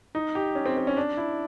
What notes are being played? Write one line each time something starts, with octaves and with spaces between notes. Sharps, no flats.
D#4
G4
C#4
C4
C4
C#4
D4
E4